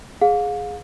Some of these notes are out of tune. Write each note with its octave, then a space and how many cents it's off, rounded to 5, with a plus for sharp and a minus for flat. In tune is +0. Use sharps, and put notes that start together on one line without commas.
G#4 +0 F5 +35